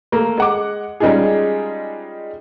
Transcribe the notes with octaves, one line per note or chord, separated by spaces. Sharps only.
A3 A#3
G#3 F#5 D6
G3 G#3 C#4 D#4 F4 G#4